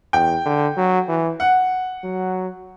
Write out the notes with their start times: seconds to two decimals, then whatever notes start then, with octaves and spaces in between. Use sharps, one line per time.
0.13 E2 G5
0.45 D3
0.77 F#3
1.09 E3
1.40 F#5
2.04 F#3